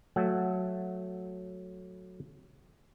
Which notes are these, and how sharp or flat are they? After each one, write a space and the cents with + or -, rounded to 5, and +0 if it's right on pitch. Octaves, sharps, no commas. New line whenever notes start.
F#3 -10 A3 +0 F#5 +0